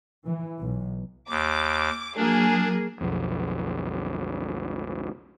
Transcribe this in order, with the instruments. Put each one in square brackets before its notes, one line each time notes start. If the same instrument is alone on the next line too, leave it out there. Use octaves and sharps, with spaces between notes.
[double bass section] E3
B1
[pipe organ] D#2 [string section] D6
[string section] F#3 A#3 G#4 [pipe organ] D4
[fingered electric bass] B1 F2